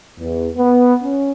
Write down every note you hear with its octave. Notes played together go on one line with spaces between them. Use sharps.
E2
B3
C#4